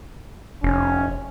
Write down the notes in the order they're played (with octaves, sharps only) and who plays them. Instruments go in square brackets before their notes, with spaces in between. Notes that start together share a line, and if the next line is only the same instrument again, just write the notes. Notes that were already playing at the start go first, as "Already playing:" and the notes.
[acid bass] F1 [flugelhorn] C#4